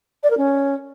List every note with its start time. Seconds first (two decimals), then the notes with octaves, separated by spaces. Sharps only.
0.23 D5
0.30 A#4
0.37 C#4